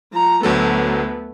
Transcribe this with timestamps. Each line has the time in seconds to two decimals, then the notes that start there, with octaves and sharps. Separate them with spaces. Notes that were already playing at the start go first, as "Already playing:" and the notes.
0.12 F3 A#5
0.43 D2 F#3 A3 B3 A4